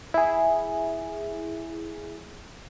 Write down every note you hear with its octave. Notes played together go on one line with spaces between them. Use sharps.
E4 G#4